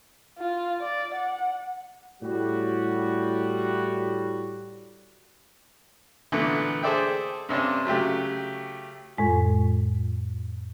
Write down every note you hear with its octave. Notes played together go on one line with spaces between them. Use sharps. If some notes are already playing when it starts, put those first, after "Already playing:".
F4
D5
F#5
A2 G3 F#4
A#2 D3 E3 A3 B3
G#4 A4 C5 D5 E5 G5
G2 C3 C#4 D4
C#3 F#3 A3 G4
F2 A2 G#3 F4